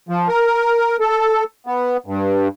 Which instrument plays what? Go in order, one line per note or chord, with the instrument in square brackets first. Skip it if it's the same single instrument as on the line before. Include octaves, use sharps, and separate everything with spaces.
[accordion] F3
A#4
A4
B3
G2